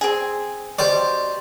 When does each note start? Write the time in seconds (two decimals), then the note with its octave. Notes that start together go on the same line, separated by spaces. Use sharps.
0.01 C4 G#4
0.78 B2 G4 C5 D5